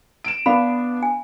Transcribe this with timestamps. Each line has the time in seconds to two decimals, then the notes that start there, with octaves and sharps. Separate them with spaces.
0.24 D7 E7
0.46 B3 D4 F5 B5
1.03 G#5